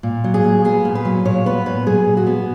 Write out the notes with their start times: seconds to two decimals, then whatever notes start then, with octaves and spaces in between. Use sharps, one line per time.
0.03 A#2
0.24 F#3
0.34 G#4
0.44 A#2
0.64 B3 G#4
0.85 A#2
0.95 B4
1.05 F#3
1.25 A#2 C#5
1.46 B3 B4
1.66 A#2 B4
1.86 F#3 G#4
2.07 A#2
2.17 F#4
2.27 B3